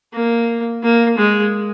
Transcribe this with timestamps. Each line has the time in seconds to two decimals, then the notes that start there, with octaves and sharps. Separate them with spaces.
0.14 A#3
0.83 A#3
1.18 G#3